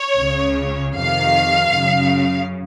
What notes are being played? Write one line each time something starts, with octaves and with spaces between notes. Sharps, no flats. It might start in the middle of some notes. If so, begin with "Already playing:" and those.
Already playing: C#5
C#2 C#3
F2 C3 D#3 F5
F#2 C#3